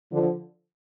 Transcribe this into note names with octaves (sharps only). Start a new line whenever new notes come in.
D3 F3